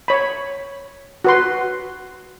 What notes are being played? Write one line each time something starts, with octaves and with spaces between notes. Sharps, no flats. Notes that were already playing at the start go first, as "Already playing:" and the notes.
C#5 B5
F#4 B4 C6